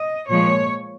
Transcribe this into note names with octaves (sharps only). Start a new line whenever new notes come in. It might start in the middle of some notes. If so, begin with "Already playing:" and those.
Already playing: D#5
A#2 F3 G#3 C#5